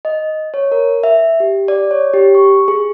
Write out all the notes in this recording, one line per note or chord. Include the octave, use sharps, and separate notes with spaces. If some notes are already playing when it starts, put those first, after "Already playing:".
D#5
C#5
A#4
E5
G4
D5
C#5
G4
C#6
G#4